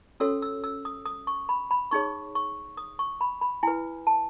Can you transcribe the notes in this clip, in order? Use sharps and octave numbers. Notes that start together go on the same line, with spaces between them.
C#4 F#4 A4 C#5 E6
E6
E6
D#6
D#6
C#6
B5
B5
D#4 G#4 C#5 C#6
C#6
D#6
C#6
B5
B5
E4 B4 G#5
A5